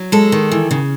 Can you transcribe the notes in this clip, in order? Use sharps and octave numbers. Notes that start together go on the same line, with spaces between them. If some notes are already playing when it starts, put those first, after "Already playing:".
Already playing: F#3
G#3 A4
D#3
E3
C#3